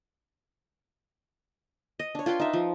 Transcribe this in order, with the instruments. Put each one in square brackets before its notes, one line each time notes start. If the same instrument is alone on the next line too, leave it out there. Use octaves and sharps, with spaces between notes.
[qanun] D#5
D4 C#5
F4 B4 G5 C6
D#4 E5
F3